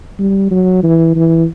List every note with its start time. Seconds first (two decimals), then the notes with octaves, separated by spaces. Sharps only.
0.19 G3
0.51 F#3
0.83 E3
1.15 E3